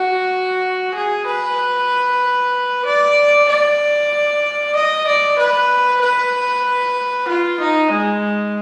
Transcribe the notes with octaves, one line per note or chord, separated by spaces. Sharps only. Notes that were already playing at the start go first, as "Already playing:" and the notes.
Already playing: F#4
G#4
B4
D5
D5
D#5
D5
B4
B4
F4
D#4
G#3